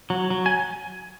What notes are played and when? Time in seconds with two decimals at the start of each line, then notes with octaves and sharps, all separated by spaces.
0.10 F#3
0.30 F#3
0.46 G#5